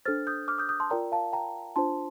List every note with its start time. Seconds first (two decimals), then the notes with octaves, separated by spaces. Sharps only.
0.05 D4 A4 C5 F6 A6
0.27 D#6 G6
0.48 D6 F6
0.58 D#6 G6
0.69 D#6 G6
0.80 A5 C6
0.90 F4 A#4 D5 G5 A#5
1.12 F5 A5
1.33 G5 A#5
1.76 D4 F4 C5 A5 C6